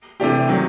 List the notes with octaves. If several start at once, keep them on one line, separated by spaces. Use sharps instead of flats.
C3 E3 A3 D4 G4
C3 D#3 F#3